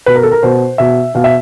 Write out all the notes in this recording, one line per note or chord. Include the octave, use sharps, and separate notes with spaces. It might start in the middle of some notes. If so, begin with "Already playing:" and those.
B2 B4
A#4
A4
A#4
B2 C5
B2 E5
B2 F5
E5